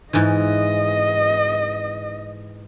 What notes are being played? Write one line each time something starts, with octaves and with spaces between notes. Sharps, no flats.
G#2 E3 D#5